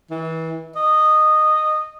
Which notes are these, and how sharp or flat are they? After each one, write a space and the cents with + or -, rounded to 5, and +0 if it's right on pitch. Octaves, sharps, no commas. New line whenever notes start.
E3 -30
D#5 -10